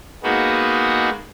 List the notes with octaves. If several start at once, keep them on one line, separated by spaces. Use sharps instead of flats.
G#3 A#3 B3 D#4 F#4